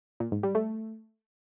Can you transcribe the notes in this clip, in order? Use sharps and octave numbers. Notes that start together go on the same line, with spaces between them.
A#2
G#2
G3
A3